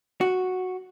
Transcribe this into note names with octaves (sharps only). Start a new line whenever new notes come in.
F#4